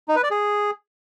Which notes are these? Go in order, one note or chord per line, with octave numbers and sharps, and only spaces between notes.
D#4
B4
D5
G#4